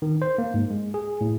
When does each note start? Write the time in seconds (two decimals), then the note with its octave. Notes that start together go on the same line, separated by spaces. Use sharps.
0.02 D#3
0.22 C5
0.38 A#3
0.54 G#2
0.70 G#3
0.94 G#4
1.21 A2